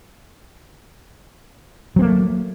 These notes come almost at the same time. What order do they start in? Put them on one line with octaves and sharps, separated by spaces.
F#3 C4 A#3 A3